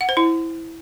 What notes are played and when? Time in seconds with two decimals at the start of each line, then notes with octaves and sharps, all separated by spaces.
0.01 F#5
0.09 C5
0.17 E4